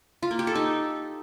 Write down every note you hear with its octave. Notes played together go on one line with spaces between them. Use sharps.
F4
A#3
G4
A4
D#4